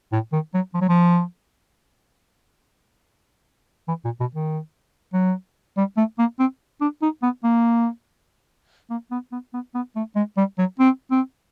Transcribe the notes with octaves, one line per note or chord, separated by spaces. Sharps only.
A2
D#3
F#3
F3
F#3
F3
E3
A#2
B2
D#3
F#3
G3
A3
A#3
C4
D4
D#4
B3
A#3
A#3
B3
B3
B3
B3
A3
G#3
G3
F#3
C4
C4